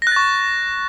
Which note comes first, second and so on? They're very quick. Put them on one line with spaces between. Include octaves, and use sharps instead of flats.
A#6 F#6 A6 C#6